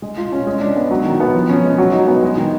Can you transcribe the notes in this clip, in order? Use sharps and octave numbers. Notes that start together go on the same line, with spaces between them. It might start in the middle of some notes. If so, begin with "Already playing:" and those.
G#3
F4
C#4
G#3
D4
B3
F#3
D#3
B3
F3
C#4
G#3
F#3
D#4
B3
G#3
D#3